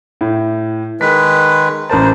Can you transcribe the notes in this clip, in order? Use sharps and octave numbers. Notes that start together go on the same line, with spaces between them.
A2
D#3 G#3 B4 B6
A1 A#4 C5 A5